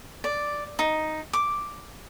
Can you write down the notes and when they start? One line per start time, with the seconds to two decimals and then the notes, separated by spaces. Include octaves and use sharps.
0.24 D5
0.79 D#4
1.33 D6